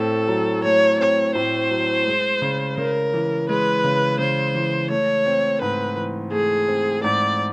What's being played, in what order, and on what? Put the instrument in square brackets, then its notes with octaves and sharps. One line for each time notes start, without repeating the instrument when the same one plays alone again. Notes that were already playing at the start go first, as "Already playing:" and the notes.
Already playing: [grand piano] A2 A3 C4 [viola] A4
[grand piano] F#3
[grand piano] A3 [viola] C#5
[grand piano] C4 [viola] C#5
[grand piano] A2 [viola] C5
[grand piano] F#3
G#3
C#3
[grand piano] C#3 [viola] A#4
[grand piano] E3
[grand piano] G#3 [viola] B4
[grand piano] C#3
[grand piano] C#3 [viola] C5
[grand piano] E3
[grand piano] A3 [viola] C#5
[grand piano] C4
[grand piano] G#2 [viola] B4
[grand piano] E3
[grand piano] A3 [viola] G#4
[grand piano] C4
[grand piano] G#2 [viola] D5